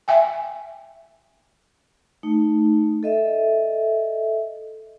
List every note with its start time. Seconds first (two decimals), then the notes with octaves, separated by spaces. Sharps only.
0.08 E5 G5 G#5
2.23 A3 D#4
3.03 A4 D#5 E5